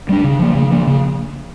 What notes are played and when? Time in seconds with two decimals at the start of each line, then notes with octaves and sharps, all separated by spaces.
0.09 G3 A#3 D4
0.24 C#3
0.39 F3 A#3
0.55 C#3
0.71 F3 A#3
0.87 C#3